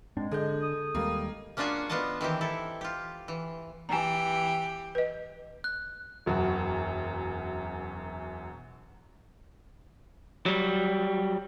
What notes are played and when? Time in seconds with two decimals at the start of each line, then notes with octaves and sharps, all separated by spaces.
0.17 G#2 G#3 C4 D4
0.32 D3 G#4 A4 D#5 G6
0.61 D#6
0.95 D#2 G3 G#3 A#3
1.57 A#3 C#4 D4 F4 F#4 G#4
1.89 B3 D4 F4 D#5 A5
2.21 D#3 E3 C4 G4
2.41 E4 A4
2.81 F4 G4
3.28 E3
3.89 E3 G4 G#5 A#5
4.95 B4 D#5
5.64 F#6
6.26 E1 F#2 F#4
10.46 F#3 G3